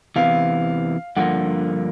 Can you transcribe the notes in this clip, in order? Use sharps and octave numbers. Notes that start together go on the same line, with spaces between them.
E2 C3 E3 F5
G2 D3 F3 A#3 F#5